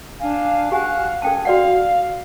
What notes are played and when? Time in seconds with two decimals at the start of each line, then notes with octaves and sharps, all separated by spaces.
0.20 D4 F5 G#5
0.72 F#4 G4 F5 G#5 F#6
1.22 C#4 A4 G5 A5
1.45 F#4 D5 F5 F#5